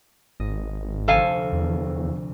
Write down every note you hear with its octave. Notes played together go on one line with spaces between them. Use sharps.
G#1 D#5
F1 D2 C4 A4 F5 G#5
E2